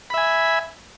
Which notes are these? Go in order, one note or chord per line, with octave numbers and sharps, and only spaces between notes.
E5 G#5 B5